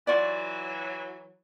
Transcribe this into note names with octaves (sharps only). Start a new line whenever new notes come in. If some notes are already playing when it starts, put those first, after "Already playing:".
E3 F#3 F4 F#4 D5